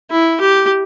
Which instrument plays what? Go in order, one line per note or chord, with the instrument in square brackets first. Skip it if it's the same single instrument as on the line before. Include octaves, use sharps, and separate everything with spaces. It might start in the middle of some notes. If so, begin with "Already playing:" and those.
[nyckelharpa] E4
G4